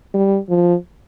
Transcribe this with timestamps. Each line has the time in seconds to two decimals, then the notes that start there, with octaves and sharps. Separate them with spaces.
0.14 G3
0.49 F3